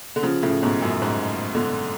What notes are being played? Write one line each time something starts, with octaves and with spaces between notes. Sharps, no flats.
D3
C#3 F3
A2 C#3
G#2 B2
F#2 A2
G#2
B2 D3